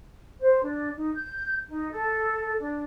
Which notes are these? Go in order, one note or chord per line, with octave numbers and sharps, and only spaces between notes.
C5
D4
D#4
G6
D#4
A4
D4